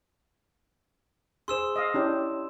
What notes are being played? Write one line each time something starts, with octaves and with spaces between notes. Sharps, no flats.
G#4 C5 C6 E6 E7
D#5 F5
C#4 D4 E4 G4